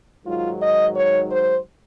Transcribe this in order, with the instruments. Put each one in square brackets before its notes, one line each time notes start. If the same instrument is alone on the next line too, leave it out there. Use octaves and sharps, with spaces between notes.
[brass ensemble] G#2 D#3 F#3 F4
D#5
C#5
C5